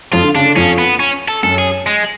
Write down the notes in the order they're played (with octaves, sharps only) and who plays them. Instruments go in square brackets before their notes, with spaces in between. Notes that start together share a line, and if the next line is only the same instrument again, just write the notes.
[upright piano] F2 F3 [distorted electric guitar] F4
[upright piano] D3
[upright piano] C#3 [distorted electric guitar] D4
[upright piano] D3
[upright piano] F2 F3 [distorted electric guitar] C#4
[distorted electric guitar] B3
C#4
A4
[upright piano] F#2 F#3 [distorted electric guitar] A4
[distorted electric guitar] G#4
G#3